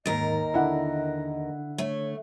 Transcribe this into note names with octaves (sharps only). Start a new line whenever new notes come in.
D#2 G#2 D#3 A#4 D#5 A6
D3 D4 E4 F#5
A3 C#5